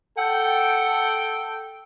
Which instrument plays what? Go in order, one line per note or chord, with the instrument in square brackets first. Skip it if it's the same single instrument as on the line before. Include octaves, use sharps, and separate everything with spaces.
[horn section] A4 G5 [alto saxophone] F#5